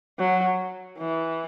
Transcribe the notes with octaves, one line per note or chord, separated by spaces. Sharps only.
F#3
E3